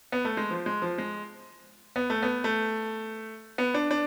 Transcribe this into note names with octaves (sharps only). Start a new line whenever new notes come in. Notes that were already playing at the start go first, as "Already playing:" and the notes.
B3
A3
G#3
F3
G#3
F3
G#3
B3
A3
B3
A3
B3
D4
D4